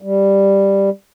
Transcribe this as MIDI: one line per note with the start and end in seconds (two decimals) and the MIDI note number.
0.02 0.90 55